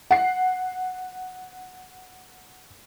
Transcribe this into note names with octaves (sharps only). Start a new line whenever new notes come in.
F#5 C7